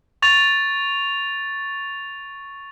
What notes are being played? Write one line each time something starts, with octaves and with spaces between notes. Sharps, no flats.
C#6 A6 F7